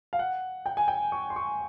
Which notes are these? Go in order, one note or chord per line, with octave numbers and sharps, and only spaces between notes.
F5
F#5
G5
G#5
G5
C#6
C6
C#6